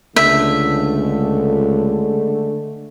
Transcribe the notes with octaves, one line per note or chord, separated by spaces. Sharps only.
C#2 D3 G#3 A3 E5